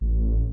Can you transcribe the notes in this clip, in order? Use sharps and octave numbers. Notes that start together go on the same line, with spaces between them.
A1